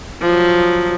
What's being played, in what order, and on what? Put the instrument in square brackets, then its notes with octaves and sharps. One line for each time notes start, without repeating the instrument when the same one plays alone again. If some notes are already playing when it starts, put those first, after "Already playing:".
[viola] F3 F#3